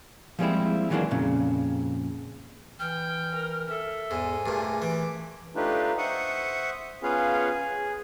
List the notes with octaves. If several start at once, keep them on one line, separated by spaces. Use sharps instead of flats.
F3 G3 G#3 A#3 C4 E4
D#3 E3 F#3 G#3 A#3 D4
F2 A#2 C#3
E3 G5 F6
A#4
A4 E5
E2 G#2 G#5
G2 A#2 A3 G#4
E3 D6
A3 D4 D#4 F4 G4 B4
C5 E5 F#5 C#6 D#6
B3 C#4 F4 G#4 B4 F5
G#4